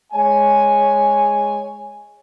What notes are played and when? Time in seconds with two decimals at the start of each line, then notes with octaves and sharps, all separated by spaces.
0.13 G#3 C#5 G#5